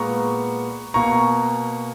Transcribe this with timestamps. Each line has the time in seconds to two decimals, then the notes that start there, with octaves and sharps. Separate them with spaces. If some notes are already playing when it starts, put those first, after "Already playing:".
Already playing: A#2 G#3 B3 A#5 C#6
0.94 B2 A#3 A#5 C#6